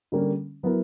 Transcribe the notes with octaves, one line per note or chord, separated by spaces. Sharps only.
D3 G3 A#3 C#4
F#3 B3 E4 A#4